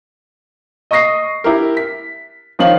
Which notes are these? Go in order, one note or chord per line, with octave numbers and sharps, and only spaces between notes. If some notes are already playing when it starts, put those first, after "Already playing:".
D#5 C#6 D#6 A#6 C7
E4 G4 A#4
B6
D#3 F3 C#5 F5 F#7